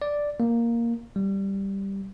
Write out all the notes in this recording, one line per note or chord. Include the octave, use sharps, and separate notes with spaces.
D5
A#3
G3